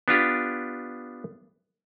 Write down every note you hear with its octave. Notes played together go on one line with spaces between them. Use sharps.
B3 D4 F4 G4